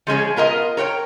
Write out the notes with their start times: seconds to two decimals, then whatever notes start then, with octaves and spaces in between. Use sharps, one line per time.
0.07 F3 G#3 C#4 G#4
0.36 B3 F4 A#4 D#5
0.77 A#4 C#5 F#5 G5